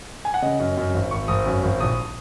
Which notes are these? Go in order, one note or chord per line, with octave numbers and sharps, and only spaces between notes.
G#5
F#5
C#3 D#5
F#2
F#2
G#1
G#1 C#6
G#1 D#6
F#2
G#1
A#1 D#6